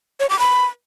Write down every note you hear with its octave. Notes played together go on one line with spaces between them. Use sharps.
C#5
D6
B5